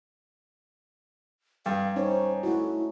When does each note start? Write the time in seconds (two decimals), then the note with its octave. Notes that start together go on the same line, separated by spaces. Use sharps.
1.66 G2 F5
1.96 C#4 D#4 C5 C#5
2.43 A3 E4 F#4